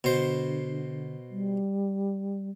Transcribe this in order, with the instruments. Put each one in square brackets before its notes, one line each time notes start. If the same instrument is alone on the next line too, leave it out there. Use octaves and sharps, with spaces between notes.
[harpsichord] B2 C5 [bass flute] D3
[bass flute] G3